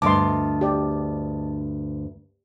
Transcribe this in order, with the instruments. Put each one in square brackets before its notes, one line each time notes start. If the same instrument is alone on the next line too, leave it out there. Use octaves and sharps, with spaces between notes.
[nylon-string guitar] D2 G2 [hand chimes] D#5 A5 [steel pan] C6 D6
[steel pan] G4 D5